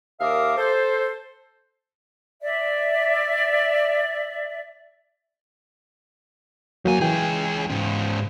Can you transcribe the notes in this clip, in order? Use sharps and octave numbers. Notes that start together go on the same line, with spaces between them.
D#2 A#4 E5 F5 D6 D#6
A4 C5
D5 E5
E2 F#3 A#3 G#5
C#2 E3 G#4 G5
G#2 C#3